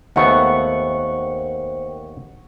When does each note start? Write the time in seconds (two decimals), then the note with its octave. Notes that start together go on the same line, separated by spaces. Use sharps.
0.16 D#2 A3 B3 A#4 C5 F#5 G5 C#6